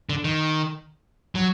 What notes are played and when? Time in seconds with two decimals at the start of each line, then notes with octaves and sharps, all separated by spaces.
0.09 D3
0.24 D#3
1.35 F#3